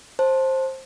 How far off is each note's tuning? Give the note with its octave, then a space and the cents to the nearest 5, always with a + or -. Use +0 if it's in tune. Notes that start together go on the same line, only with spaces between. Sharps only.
C5 +15 A5 +0